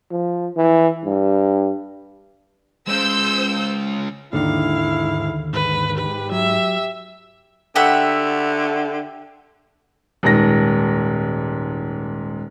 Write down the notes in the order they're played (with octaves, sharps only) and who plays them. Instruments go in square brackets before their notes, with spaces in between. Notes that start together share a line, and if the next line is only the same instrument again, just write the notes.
[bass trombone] F3
E3
G2
[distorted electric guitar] C#3 G#3 [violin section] C5 E6 G6
[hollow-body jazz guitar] D#2 D3 D#3 [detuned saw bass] G#2 [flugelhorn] E4 [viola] F5
[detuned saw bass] G#2 [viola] B4
[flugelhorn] G4 [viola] B4
[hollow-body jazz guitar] F#3 [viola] E5
[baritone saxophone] D3 [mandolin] G4 E5 F#5
[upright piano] D#1 G#2 A#6